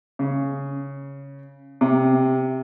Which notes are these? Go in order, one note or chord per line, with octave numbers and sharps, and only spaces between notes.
C#3
C3